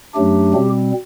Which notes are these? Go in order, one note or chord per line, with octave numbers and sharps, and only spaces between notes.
F#2 F#3 A3 D4 G4
B2 G3 C4